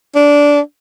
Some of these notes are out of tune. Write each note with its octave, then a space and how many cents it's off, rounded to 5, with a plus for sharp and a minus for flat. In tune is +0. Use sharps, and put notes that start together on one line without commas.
D4 -15